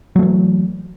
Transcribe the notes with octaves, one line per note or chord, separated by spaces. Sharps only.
E3 F#3 A3